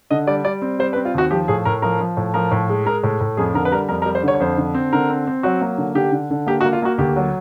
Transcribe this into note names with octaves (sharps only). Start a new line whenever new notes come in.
D3 D#5
G3 D5
G3 D5
C4
G3 C5
B4
C4
F4
D#2 F#4
F3 G4
A2 G#4
A2 A#4
F3 A#4
F3
A2
F3 A#4
A2
G#3
G#3 A#4
A2
A2
F2 G#4
D3 A#4
B4
G3 A#4
F2 A#4
A#4
G3
C5
D3 C#5
C#5
F2 C5
D3
C4
D3 A#4
C4
C4
F#3 F#4
A#3
D3
D3 G4
D3
D3
A#3 G4
F#4
A#3
F4
A#3 F#4
D2 G4
F#3